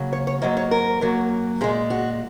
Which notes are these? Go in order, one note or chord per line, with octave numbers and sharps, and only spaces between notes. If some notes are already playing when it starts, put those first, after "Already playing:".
Already playing: C#3 F#3 A#3
C#5
C#5
G#2 F#3 A#3 D#5
C#5
A#4
F#2 F#3 A#3
A#2 G#3 G#4
F#4